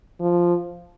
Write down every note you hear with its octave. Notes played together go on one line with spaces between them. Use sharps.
F3